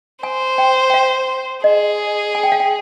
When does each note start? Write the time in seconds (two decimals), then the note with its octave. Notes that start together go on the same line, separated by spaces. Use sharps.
0.23 C5 G#5
0.58 G5
0.90 G5
0.94 F5
1.64 G#4 D#5
2.35 G#5
2.43 G5
2.52 F5
2.60 G5